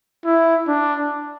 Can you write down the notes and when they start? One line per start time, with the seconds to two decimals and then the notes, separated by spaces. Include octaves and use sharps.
0.25 E4
0.68 D4